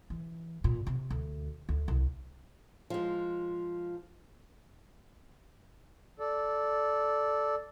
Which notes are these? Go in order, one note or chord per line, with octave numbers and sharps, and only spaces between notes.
E3
A#2
C3
D2
D2
C2
F3 G#3
A4 D5